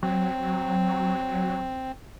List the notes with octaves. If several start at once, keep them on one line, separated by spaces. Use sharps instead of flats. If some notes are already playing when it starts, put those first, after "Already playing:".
F#3 C4